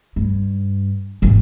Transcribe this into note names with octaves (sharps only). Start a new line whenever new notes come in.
G2
G#1 E2